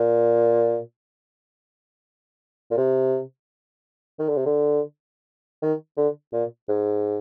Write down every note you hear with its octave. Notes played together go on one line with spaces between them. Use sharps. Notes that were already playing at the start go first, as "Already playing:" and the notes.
Already playing: A#2
A#2
C3
D#3
D3
C3
D3
D#3
D3
A#2
G#2